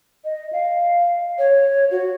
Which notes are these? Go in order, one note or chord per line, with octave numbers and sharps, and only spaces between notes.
D#5
F5
C#5
F#4